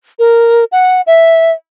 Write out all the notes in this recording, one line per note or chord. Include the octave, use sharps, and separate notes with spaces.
A#4
F#5
E5